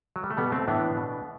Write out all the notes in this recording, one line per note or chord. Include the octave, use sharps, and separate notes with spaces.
F#3
G3
A3
B2 G3 B3
A3 C4
A2 E3 B3 D4
B2